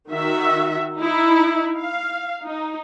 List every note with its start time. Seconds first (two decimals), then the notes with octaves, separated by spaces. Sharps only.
0.11 D#3 F#4 E5
0.97 D#4 E4
1.77 F5
2.44 D#4